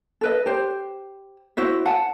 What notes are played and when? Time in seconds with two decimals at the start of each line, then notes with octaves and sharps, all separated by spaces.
0.21 A4 B4 D#5
0.46 G4 C5
1.57 E4 F#4 C5 E5
1.86 F#5 A5